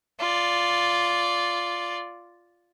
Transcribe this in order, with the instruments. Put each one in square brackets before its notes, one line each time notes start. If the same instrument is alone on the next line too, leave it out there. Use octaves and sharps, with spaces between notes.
[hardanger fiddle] F4 D5